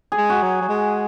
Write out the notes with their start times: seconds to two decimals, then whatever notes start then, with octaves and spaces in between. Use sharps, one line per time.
0.12 G#4
0.18 G#3
0.30 F#4
0.43 F#3
0.61 F#3
0.69 G#3